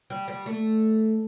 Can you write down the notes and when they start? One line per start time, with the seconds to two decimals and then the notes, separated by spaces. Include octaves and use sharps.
0.10 G3
0.28 G3
0.46 A3